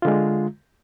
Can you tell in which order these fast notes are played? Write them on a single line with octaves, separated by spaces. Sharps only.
F4 D3 G#3